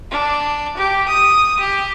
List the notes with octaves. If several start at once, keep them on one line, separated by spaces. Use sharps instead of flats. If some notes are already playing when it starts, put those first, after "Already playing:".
D4
G4
D#6
G4